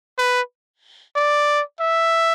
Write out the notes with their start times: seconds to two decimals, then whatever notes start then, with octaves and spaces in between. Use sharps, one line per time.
0.19 B4
1.16 D5
1.80 E5